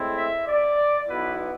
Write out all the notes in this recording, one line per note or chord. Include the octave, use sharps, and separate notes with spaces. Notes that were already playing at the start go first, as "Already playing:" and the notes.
Already playing: A2 G#3 C4 E4
E5
D5
B1 B2 B3 E4 B4